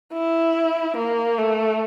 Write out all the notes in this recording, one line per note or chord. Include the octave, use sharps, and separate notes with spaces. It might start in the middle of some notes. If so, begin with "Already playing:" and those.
E4
A#3
A3